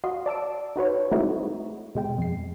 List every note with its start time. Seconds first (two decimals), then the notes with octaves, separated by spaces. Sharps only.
0.04 F#4 D#5 F5 C6
0.26 D5 A5 E6 D7
0.76 D#4 F#4 B4 C#5
1.11 G#3 A3 C4 D#4 E4 F#4
1.95 B2 G#3 G5
2.18 F2 C7